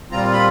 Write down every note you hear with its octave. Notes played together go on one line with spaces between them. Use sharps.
A#2 G3 C4 F4 A#5
B5